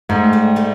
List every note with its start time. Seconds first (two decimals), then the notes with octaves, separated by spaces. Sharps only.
0.09 G#2 G3 A3
0.33 G3 A3
0.56 G3 A3